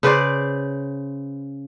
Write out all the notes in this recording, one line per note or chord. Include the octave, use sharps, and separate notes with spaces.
C#3 B4 C5 D5